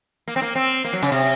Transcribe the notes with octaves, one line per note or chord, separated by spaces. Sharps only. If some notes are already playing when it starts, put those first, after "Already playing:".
A#3
C4
A#3
C4
A#3
F#3
C#3
C3